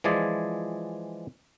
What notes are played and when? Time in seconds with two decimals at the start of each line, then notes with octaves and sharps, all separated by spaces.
0.04 E3 F3 G#3 G#4 D5